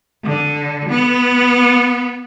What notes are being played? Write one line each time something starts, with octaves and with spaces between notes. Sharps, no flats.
D3
B3